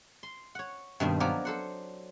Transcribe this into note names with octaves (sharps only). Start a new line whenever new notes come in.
C6
C#5 F#5
G2 B2 D#3 C4
F3 F#3 B3 A#4 D5 D#5
A4 C5 F#5